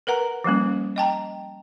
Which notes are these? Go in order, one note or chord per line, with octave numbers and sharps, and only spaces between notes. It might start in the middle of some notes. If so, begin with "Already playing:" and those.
A#4 B4 F#5 A#5
F3 G3 A#3 C#4
D#5 G5 A5 A#5